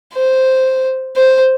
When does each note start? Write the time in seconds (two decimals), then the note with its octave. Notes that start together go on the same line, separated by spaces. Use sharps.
0.14 C5
1.16 C5